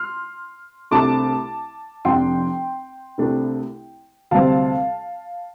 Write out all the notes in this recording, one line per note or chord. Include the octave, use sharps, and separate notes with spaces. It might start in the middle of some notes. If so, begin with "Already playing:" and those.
Already playing: C6 F6
C2 C3 A3 D4 A5 D6
F1 F2 F3 D4 G5 C6
C2 C3 A3 D4
D2 C3 G3 C4 F5 A5